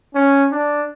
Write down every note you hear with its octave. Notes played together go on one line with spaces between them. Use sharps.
C#4
D4